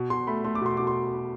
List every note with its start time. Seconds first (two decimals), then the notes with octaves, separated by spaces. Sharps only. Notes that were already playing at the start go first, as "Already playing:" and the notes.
Already playing: B2
0.10 B2 C6
0.27 A3 B5
0.45 A3 C6
0.55 D6
0.61 B2 C6
0.77 B2 D6
0.87 C6